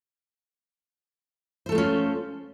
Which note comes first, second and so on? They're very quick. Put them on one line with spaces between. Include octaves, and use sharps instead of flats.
C5 A4 A3 F4 C#4